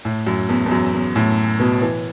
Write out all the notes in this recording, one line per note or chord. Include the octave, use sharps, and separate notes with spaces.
A2
F#2
E2
E2
F#2
E2
A2
B2
E3